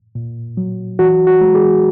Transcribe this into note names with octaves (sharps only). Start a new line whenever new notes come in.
A#2
F#3
E3 F#4
F#4
G#3
G#4